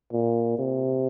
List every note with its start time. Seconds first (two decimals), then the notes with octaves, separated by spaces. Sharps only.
0.13 A#2
0.59 C3